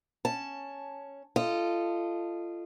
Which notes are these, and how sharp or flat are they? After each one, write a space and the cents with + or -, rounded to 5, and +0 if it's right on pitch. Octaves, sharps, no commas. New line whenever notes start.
C#4 +0 A5 +0
F4 -25 A4 +0 D#5 -15